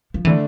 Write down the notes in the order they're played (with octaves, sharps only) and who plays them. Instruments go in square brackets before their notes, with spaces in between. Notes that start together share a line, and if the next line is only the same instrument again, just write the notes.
[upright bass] F3
[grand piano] D3 A3 D4 [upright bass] E3